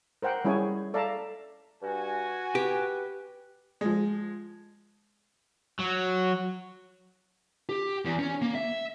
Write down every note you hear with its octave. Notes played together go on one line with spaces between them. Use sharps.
A#4 C5 F#5 G5
G3 C#4 E4 G#4 C#5 G#5
A4 D5 E5 F5 A5 A#5
G2 F#4 G#5
G4 B4
F3 G#3
F#3
G4
E2
C#4
A#3
E5